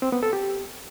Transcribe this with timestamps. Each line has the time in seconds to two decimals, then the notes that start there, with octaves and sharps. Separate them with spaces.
0.02 C4
0.12 B3
0.23 A4
0.33 G4